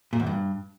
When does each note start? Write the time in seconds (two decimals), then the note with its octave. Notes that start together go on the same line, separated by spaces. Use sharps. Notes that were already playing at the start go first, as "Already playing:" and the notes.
0.13 A#2
0.20 E2
0.27 G2